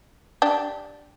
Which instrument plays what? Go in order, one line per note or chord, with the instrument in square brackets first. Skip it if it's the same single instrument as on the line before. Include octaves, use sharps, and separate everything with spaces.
[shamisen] D4 G4